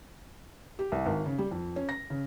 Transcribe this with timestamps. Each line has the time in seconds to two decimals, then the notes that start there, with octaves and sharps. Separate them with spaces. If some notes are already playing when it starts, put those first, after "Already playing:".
0.79 G4
0.92 C2
1.06 G#1
1.26 C#3
1.38 G3
1.51 F2
1.76 C#4
1.89 A#6
2.10 C#3